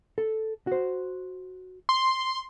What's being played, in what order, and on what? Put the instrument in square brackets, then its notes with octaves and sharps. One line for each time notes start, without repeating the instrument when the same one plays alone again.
[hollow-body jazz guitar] A4
F#4 C5
[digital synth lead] C6